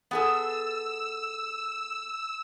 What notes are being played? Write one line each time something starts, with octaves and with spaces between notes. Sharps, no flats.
B3 G#4 A4 E6